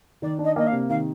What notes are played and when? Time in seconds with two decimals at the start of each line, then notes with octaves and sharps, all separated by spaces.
0.22 D#3 D5
0.39 D4
0.44 D#5
0.56 A#3 D#5
0.67 F5
0.72 C3
0.89 D#3 F5